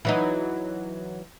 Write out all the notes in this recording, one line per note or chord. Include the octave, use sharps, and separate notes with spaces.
E3 F#3 D#4